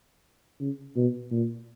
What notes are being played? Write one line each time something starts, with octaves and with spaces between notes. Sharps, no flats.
C#3
B2
A#2